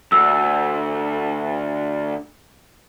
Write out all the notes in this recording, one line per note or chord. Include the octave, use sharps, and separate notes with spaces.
D2 E6